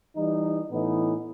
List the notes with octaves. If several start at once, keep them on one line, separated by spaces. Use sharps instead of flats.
E3 G3 D#4
A2 E3 B3 D#4